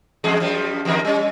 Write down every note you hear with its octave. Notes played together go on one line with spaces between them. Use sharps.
E2 G#3 G#4
F#2 F3 G3
E2 D#3 A#4
G3 C#4